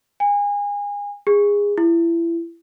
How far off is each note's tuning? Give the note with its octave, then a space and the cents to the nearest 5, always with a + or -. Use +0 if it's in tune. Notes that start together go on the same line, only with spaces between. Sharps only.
G#5 -30
G#4 -20
E4 +30